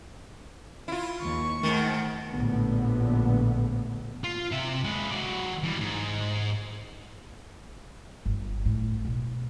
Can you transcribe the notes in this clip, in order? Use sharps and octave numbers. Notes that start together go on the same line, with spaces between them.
E4 F4
D#2 C#6
G#2 D#3 A3
A#1 A2 D3 B3
F4
C3 E5
G#3 B4
F#3 D5
E3 G3
G#2
G1
A2
B2